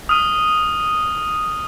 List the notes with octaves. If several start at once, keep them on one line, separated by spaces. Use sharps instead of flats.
D#6 F6 D#7